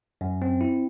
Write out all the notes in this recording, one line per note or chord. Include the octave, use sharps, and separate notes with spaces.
F#2
C4
E4